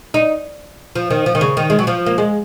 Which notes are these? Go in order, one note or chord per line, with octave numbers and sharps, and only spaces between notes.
D#4
F3
D#3
F3
D#3
C#3
D#3
G#3
F#3
F3
A#3
G#3